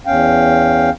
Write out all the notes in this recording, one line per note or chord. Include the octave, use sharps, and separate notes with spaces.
E2 C#4 F5 G5